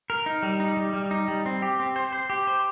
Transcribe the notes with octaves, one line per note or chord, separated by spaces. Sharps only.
A#4
D#4
G3
D#4
G3
G3
D#4
G3
C4
G4
C4
C5
C5
G4
C5